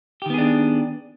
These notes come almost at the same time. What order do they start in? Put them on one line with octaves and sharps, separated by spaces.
G4 D#3 B3 G#4 D4